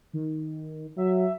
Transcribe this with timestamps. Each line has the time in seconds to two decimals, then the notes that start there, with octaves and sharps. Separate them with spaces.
0.13 D#3
0.97 F#3 E5